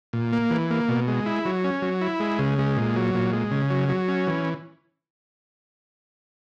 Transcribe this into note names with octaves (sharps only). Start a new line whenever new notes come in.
A#2
A#3
E3
A#3
B2
G#3
E4
F#3
C#4
F#3
E4
G#3
C#3
G#3
A#2
F#3
A#2
G#3
C#3
F#3
F#3
C#4
E3